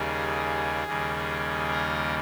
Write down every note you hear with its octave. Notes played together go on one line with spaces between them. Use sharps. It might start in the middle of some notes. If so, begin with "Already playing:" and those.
Already playing: D#2 C#3 G3 A#3 G#4
D#2 C#3 G3 A#3
A#4